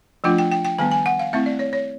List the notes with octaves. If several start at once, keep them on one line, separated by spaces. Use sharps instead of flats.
F3 A3 D4 F4 G5
G5
G5
G5
D#3 G3 B3 G#5
G#5
F#5
F5
A3 C4 E4 E5
D5
C#5
C#5